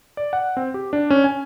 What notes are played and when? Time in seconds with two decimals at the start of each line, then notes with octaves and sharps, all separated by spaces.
0.17 D5
0.33 F#5
0.57 C4
0.74 G4
0.93 D4
1.10 C#4
1.24 G#5